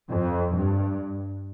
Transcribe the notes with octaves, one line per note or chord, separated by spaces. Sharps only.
F2
G2